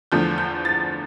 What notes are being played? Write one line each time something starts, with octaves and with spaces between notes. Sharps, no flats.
E2 D3 F3 A3 G6
G6
A6